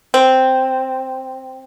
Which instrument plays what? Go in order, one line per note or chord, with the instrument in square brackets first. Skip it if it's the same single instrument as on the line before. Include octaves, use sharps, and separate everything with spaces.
[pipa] C4